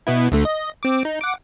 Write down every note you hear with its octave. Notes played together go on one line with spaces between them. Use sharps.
B2 B3 E4
D2 D3 A3
D#5
C4 D6
D#4
F#5 D6